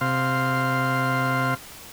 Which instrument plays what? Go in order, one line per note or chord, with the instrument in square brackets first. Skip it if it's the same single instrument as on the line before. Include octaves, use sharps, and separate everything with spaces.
[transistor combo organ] C3 F5 C6